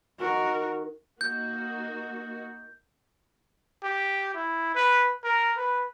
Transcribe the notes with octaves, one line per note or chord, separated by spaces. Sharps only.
D#3 F#4 A#4
A#3 D#4 F#4 G6
G4
E4
B4
A#4
B4